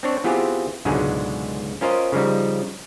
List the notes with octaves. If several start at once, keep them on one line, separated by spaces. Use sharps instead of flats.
C4 D4 C#5
E3 B3 C4 F4 G4 G#4
C#2 G#2 B2 D3 F#3 G#3
C#4 F4 A#4 C5 D#5
C#3 F3 G3 D#4